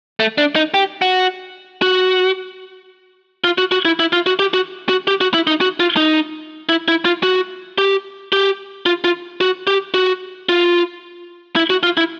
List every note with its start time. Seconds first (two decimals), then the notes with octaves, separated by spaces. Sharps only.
0.20 A3
0.38 D4
0.56 D#4
0.74 G4
1.02 F#4
1.82 F#4
3.44 F4
3.58 F#4
3.72 F#4
3.85 E4
4.00 E4
4.13 F4
4.26 F#4
4.39 G4
4.54 F#4
4.89 F#4
5.08 G4
5.21 F#4
5.34 E4
5.47 D#4
5.61 F#4
5.80 F4
5.97 D#4
6.69 E4
6.88 E4
7.05 F4
7.23 F#4
7.78 G4
8.33 G4
8.86 F4
9.04 F4
9.41 F#4
9.67 G4
9.94 F#4
10.49 F4
11.56 E4
11.70 F#4
11.83 F4
11.97 E4